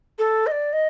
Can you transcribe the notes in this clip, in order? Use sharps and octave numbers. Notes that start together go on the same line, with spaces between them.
A4
D#5
D5
D#5